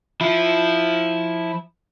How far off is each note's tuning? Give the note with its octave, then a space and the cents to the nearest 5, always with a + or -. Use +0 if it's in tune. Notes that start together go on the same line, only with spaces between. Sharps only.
F3 +0 E4 -5